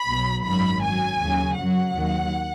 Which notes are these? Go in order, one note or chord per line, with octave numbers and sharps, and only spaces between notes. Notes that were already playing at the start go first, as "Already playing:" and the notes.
Already playing: B5
B1 B2 F#3
G#1 F#2 D#3 F#3 B5
F#2 F#3 G#5
D#2 C#3 F#3
F#2 F#3 F#5
D#2 D#3 F#3